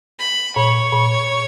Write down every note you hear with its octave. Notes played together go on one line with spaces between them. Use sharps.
B5
A#2 C#5
A#2